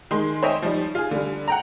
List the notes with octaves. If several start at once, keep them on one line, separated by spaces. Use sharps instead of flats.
D#3 G#3 C6
C5 C#5 D#5 E5 G5 G#5
F3 G3 D#4
F4 G#4
D3 G3
F#5 G5 A#5